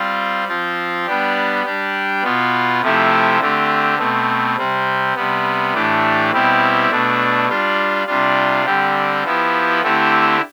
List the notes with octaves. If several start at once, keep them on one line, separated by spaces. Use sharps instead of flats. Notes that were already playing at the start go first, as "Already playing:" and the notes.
Already playing: G3 C4 F4
F3 C4 F4
G3 B3 D4 G4
G3 D4 G4
B2 B3 F4
C3 F3 A3 E4 G4
D3 A3 C4 G4
B2 A3 C4
C3 G3 C4
C3 G3 B3
A2 E3 A3 D4 G4
B2 G3 C4 E4 G4
B2 A3 D4
G3 D4 F4
C3 G3 D4 F4
D3 G3 C4 G4
F3 B3 E4 G4
D3 A3 C4 E4 G4